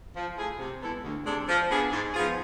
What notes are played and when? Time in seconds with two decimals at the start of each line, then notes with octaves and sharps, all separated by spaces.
0.16 F3
0.37 A3 E4 G#4
0.59 C3
0.82 G#3 B3 E4 A4
1.04 D2
1.26 C3 G#3 D4 A4
1.48 F3
1.71 B3 D4 G#4
1.92 G#2
2.14 F3 B3 F4 G#4